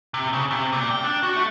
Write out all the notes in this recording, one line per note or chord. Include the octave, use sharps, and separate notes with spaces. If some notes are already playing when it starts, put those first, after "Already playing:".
C3
C#3
C3
A#2
G5
D4
F#4
A3